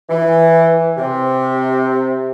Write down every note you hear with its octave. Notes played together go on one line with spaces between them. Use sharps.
E3
C3